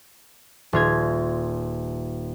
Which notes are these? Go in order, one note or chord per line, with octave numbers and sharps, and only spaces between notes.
D#1 F4 G#6